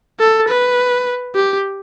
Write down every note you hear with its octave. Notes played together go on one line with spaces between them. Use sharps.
A4
B4
G4